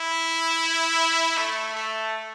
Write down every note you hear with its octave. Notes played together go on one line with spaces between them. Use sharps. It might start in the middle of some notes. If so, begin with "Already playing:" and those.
Already playing: E4
A3
A3